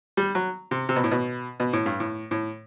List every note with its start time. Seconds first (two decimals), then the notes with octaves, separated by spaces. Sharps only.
0.17 G3
0.35 F#3
0.71 C3
0.89 C3
0.96 B2
1.04 A2
1.11 B2
1.60 B2
1.73 A2
1.86 G2
2.00 A2
2.31 A2